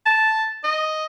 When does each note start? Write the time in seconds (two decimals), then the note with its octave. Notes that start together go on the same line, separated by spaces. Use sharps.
0.06 A5
0.64 D#5